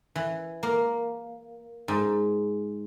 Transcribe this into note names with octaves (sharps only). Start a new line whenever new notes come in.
E3
A#3
G#2